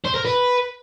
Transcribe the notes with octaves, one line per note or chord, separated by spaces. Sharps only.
C5
A#4
B4